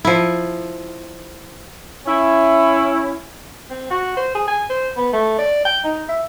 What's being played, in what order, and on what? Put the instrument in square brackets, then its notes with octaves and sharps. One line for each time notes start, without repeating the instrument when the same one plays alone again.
[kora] F3 E4
[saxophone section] C#4 E4
[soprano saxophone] C4
F#4
C5
G#4
G#5
C5
B3
A3
D5
G5
D#4
E5